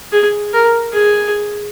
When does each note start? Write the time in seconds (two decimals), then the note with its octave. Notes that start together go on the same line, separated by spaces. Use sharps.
0.12 G#4
0.53 A#4
0.93 G#4